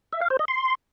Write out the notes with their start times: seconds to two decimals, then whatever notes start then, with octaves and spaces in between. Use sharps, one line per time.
0.12 E5
0.21 F5
0.30 C5
0.39 D#5
0.48 C6